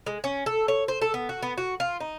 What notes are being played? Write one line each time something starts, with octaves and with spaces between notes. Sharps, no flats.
G#3
C#4
A4
C#5
C5
A4
B3
F#4
B3
F#4
F4
D#4